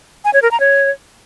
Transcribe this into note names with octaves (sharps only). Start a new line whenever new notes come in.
G#5
C#5
A#4
A#5
C#5